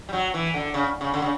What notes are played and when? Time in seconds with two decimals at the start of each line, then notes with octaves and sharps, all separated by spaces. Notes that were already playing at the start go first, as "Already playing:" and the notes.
0.09 G3
0.13 F#3
0.34 E3
0.54 D3
0.74 C#3
1.01 C#3
1.14 D3
1.22 C#3